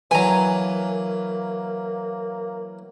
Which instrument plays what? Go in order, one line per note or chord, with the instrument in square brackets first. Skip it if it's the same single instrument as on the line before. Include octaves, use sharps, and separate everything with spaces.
[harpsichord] E3 F#3 [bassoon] A#3 [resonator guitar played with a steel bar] G#5 A#5